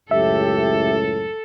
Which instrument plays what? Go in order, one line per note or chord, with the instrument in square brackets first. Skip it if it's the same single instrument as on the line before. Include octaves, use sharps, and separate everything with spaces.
[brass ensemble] C#2 F#2 A2 [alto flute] G4 [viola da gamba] A4 [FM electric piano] E5